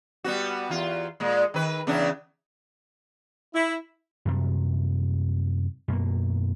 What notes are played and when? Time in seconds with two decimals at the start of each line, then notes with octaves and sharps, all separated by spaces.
0.24 G3 B3 F#4
0.69 E2 F4
1.20 A#2 G#3
1.54 D#3 B4
1.87 E2 C#3 D4
3.54 E4
4.25 F#2 C3 G3
5.88 F#2 B2 A#3